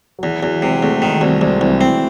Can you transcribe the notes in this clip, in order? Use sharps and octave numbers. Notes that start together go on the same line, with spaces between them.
F#3
E2 E3
E2 F#3
C3 G#3
E2 A3
D#3 G#3
C2 F#3
C2 G#3
C2 E3
C4